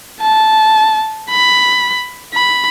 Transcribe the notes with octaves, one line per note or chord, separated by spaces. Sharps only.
A5
B5
B5